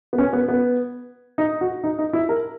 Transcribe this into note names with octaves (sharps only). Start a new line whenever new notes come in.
B3
C#4
B3
B3
D#4
F#4
D#4
D#4
E4
A#4